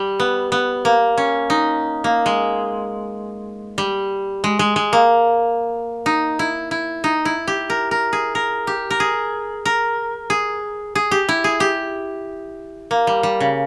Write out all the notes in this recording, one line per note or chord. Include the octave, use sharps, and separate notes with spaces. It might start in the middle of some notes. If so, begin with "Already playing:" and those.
Already playing: G3
B3
B3
A#3
C#4
D#4
A#3
G#3
G3
G#3
G#3
G#3
A#3
D#4
E4
E4
D#4
E4
G4
A#4
A#4
G#4
A#4
G4
A#4
G#4
A#4
G#4
G#4
G4
E4
G#4
G4
A#3
G3
G3
C#3